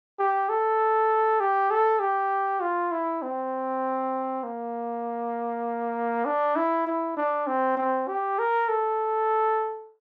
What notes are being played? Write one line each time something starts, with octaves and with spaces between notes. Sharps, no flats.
G4
A4
G4
A4
G4
F4
E4
C4
A#3
D4
E4
E4
D4
C4
C4
G4
A#4
A4